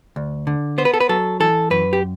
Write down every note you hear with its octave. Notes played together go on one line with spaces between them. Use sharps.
D2
D3
B3 C5
B4
A4
B4
F#3 A4
E3 A4
F#2 B4
G4